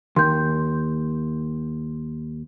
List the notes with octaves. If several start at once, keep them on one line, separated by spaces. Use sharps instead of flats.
D#2 C6 G6